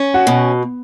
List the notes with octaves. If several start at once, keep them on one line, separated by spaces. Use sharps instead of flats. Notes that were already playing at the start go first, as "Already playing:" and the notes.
Already playing: C#4
F#4 F#5
B2